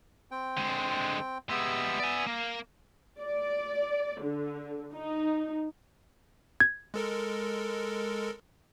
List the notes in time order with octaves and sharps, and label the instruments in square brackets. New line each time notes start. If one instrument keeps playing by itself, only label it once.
[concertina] C4 G5
[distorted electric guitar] D3 G#3
[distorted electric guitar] G3 G#3 [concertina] B3 E5 E6
[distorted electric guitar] D5 G#5
[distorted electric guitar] A#3 [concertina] F5
[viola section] D5
D3
D#4
[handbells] G#6
[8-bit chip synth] G#3 A4 A#4